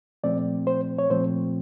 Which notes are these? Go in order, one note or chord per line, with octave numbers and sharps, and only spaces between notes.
A#2 F3 A3 C4 D5
C5
C#5
A#2 F3 A3 C4 C5